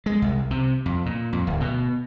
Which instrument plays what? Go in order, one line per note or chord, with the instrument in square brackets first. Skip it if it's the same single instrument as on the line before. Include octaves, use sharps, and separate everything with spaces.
[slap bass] G#3
C2
C3
F2
A#2
F2
D1
B2